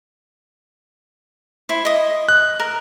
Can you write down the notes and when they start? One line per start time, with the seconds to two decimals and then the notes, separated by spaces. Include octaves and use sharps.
1.69 E4 C5
1.85 D#5 D#6
2.29 F#6
2.60 A#4